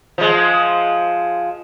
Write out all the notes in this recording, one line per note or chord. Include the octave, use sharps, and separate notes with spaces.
F3 G#3